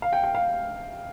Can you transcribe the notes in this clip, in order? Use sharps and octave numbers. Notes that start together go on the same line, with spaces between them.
F5
G5
G5
F5